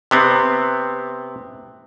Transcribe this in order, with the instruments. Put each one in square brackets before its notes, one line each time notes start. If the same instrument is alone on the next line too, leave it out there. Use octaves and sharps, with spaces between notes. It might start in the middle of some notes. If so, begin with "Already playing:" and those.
[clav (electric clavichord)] C3 B3 C4